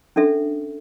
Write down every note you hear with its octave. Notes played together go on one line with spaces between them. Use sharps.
C#4 D4 A4 E5